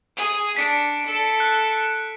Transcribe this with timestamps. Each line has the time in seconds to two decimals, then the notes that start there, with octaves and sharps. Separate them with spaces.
0.16 G#4
0.56 D4 B6 C#7 D7
1.06 A4
1.40 F#6